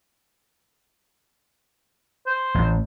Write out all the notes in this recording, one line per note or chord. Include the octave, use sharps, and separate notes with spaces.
C5
A1